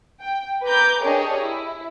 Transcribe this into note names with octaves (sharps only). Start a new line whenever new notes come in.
G5
B4 A#5 B5 D6 G6
D4 G4 G#4 A#4 C#5 D#5
E4